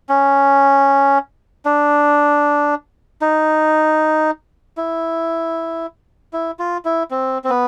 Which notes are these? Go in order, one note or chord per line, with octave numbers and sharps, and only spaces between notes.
C#4
D4
D#4
E4
E4
F4
E4
C4
C4
B3